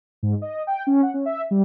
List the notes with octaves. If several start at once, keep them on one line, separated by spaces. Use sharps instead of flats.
G#2
D#5
G5
C#4
F#5
C#4
E5
G3